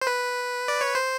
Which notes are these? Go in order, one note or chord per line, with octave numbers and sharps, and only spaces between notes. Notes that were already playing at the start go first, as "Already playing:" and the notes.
C5
B4
D5
C#5
C5